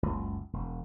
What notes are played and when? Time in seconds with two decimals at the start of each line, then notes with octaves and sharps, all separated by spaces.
0.03 F#1 C#2
0.53 E1